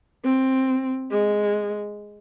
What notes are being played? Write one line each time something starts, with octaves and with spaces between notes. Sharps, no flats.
C4
G#3